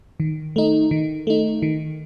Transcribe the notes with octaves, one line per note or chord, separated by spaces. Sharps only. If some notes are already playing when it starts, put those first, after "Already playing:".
D#3
A3 D#4
D#3
A3 D#4
D#3